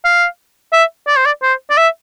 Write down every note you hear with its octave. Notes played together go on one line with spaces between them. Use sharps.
F5
E5
D5
C5
D5
C5
D5
E5